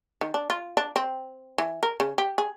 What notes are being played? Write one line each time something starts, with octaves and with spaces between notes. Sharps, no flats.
D#3
D4
F4
D4
C4
E3
A#4
C#3
G4
G#4